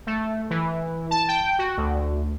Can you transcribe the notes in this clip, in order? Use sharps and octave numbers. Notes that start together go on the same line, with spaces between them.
A3
E3
A5
G5
F#4
D2